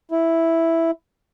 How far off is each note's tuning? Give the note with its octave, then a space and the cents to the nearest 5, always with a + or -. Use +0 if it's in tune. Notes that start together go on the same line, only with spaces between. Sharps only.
E4 +0